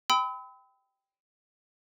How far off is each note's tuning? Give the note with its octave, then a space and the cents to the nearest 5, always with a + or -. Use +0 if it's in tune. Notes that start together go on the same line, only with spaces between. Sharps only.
G5 +0 B5 +35 E6 -40